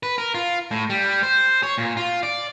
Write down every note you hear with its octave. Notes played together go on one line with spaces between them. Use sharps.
B4
A#4
F4
A2
G3
C5
C#5
A#2
F4
D5